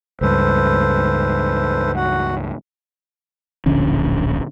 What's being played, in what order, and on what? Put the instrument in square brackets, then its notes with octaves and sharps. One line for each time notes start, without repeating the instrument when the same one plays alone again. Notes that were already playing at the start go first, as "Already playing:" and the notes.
[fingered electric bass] C#2 G2 [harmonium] A4 B4 C5
[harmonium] F#4 F#5
[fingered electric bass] D1 A#1 D3 C#4